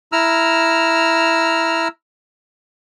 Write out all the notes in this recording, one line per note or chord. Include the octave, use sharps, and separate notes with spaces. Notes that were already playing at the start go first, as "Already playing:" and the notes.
E4 A#5 E6 F6